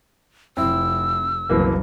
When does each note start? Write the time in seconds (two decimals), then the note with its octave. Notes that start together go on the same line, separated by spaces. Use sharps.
0.57 F1 C4 E4 E6
1.49 F#1 C2 B2 E3 A#3